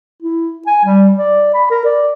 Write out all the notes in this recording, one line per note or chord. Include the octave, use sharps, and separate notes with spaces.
E4
G#5
G3
D5
B5
A#4
D5